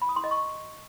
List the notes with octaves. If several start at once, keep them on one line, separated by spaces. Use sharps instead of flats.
B5
D#6
C6
D#5
C#6